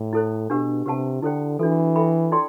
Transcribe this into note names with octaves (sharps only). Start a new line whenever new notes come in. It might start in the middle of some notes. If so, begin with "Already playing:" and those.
Already playing: A2
E4 A4 C5
B2 D4 G4 B4 F#5
C3 G4 B4 F#5 A5
D3 E4 A4 C5 G5
E3 D4 F#4 A4
A4 E5 G5 B5
E4 A4 D5 G5 C6